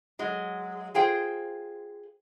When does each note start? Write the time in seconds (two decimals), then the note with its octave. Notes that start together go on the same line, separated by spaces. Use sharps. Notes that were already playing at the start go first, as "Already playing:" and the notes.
0.19 F#3 G#3
0.94 F4 G#4 C5 G5